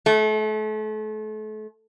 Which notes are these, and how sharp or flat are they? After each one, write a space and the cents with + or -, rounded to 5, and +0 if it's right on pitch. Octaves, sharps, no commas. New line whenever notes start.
A3 -35